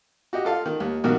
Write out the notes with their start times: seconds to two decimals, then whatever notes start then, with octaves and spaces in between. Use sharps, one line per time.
0.33 F#4 G4 D#5
0.45 F4 A4 F5
0.66 D#3
0.80 D#2
1.04 A#1 B2 D#3 F#4 A#4